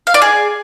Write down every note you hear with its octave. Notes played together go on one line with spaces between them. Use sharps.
F5
D5
G#4